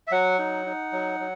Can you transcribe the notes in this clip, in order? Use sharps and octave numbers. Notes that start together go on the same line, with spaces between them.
E5
F#3 F#5
D#4
D#4
F#3
F#3